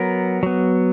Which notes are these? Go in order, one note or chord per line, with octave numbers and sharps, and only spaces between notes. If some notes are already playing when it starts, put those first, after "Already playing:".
Already playing: F#3 B3 A#4
F#3 B3